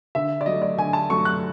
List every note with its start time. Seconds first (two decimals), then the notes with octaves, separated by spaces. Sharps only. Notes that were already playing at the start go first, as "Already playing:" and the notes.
0.15 D3 E5
0.41 D5
0.46 F#3 A3 D#5
0.62 D5
0.77 D3 G#5
0.93 A5
1.10 F#3 A3 C#6
1.25 F#6